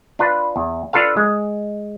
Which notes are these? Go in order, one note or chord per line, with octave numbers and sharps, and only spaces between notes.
D4 F4 B4
E2
D4 F4 A4 B4 F5
G#3